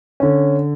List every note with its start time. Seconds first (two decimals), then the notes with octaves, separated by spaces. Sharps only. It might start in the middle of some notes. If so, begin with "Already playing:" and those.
0.20 D3 C#4